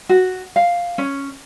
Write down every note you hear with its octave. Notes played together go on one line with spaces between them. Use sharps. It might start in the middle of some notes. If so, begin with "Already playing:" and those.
F#4
F5
C#4